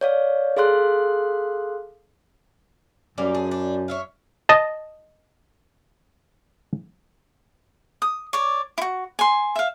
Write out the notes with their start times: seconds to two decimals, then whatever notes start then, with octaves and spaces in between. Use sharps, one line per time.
0.01 C#5 D5 F5
0.57 G#4 A4 F5 C6 F#6
3.18 F#2 G3 A#3 C#4
3.34 D4 G#4
3.51 D4
3.88 C#5 E5 F5
4.49 D#5 A5
8.02 D#6
8.33 C#5 D5
8.78 E4 F#4
9.19 G#5 C6
9.56 E5 F5